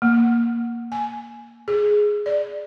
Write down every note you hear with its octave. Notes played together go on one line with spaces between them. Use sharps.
A#3
G#5
G#4
D5